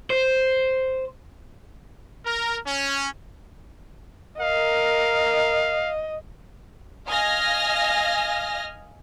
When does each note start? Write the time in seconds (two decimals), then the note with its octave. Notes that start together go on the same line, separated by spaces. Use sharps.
0.10 C5
2.25 A#4
2.66 C#4
4.40 A#4 D#5 F5
7.07 D#5 F5 G#5 F6 A#6